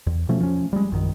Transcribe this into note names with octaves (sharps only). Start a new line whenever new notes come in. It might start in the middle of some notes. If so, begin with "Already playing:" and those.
E2
B2 F3 A3 C#4
F3 C#4
G3 G#3
A#1 F#2 D#3